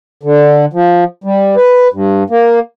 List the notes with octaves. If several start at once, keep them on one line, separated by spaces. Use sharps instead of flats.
D3
F3
G3
B4
G2
A#3